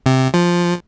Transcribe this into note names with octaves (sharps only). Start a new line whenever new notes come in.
C3
F3